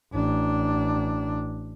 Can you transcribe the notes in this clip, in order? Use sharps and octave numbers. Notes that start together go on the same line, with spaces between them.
A1 D4